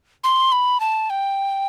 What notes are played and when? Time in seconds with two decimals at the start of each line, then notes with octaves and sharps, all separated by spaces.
0.24 C6
0.52 B5
0.80 A5
1.10 G5